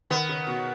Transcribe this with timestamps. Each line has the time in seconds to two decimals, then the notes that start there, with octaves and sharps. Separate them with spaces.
0.10 D#3 B3
0.29 C#3
0.47 B2